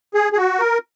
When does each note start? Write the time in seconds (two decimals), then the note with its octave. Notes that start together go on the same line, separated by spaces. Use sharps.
0.14 G#4
0.33 G#4
0.37 F#4
0.60 A#4